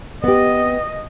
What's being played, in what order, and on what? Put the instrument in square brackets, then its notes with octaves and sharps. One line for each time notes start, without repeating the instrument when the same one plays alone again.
[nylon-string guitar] B3 G4 [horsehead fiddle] D#5